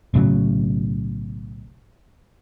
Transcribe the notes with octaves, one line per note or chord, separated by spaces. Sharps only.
B1 A2 C#3 F#3